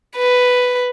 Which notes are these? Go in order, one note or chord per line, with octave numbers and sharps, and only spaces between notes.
B4